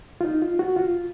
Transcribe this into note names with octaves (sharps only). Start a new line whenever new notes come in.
F4
D#4
F4
F#4
F4